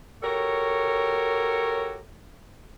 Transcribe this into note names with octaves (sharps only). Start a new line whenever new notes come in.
F#4 G4 A4 A#4 C#5